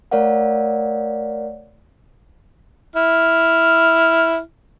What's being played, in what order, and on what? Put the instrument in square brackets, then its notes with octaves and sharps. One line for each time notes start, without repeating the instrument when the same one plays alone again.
[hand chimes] A3 A#4 C#5 D5 F5 F#5
[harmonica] E4 F6